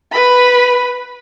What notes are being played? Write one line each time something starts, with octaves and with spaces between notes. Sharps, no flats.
B4 B5